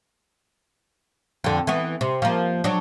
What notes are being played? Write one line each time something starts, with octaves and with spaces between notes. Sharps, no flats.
F2 D3
E3 B3
C3
F3 A#3
F#3 D4